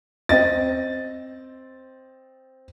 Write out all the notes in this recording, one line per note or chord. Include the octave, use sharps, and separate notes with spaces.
C4 D#5 A6